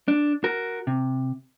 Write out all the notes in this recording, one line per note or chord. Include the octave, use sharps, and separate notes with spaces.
D4
F#4 A#4
C3